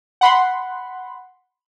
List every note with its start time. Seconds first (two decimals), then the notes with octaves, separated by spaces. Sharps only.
0.21 F#5 B5 C6